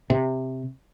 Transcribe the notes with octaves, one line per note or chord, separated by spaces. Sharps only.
C3